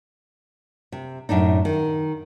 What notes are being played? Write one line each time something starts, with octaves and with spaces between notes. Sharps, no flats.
C3
F#2 A2 D4 D#4
D#3